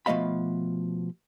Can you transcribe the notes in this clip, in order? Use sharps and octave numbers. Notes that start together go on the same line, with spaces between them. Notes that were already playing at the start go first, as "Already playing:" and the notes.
B2 F3 A3 D#5 F5 B5